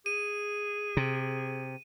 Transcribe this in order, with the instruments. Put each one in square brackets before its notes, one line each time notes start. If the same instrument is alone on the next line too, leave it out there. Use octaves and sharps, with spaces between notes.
[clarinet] G#4 [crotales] D#7
[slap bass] C3